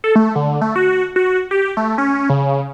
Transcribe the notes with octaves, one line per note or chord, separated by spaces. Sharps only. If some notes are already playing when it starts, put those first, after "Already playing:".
A4
A3
D3
A3
F#4
F#4
G4
A3
C#4
C#3